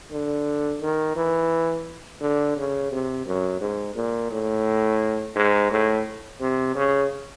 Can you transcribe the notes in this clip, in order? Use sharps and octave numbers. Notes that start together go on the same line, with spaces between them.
D3
D#3
E3
D3
C#3
C3
F#2
G#2
A#2
A2
G#2
A2
C3
C#3